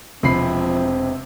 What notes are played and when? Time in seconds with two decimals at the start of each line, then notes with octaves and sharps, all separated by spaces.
0.23 E1 C3 F3 C4 B5 C7